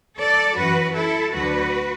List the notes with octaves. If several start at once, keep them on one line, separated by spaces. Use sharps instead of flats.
A4 D5
F#2 E3 F#4 B4
E4 A4
D2 D3 F#3 F#4 B4